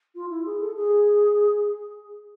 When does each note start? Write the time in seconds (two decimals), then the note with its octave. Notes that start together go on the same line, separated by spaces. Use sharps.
0.15 F4
0.30 E4
0.46 G#4
0.61 A4
0.76 G#4